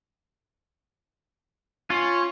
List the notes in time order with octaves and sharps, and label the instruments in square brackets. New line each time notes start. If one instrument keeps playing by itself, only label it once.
[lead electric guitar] C#4 [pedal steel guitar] F4